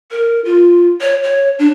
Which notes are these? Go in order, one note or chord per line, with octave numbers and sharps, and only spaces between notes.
A#4
F4
C#5
C#5
D4